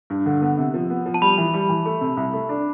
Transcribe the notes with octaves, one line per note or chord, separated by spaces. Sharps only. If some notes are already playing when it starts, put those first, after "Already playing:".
G2
D3
B3
C3
F3
B3
F3
A5
G3 B5
E3
G3
E3
A3
C3
C2
A3
D4